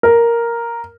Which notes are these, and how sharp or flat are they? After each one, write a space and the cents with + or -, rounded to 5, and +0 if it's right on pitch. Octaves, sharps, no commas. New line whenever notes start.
A#4 +0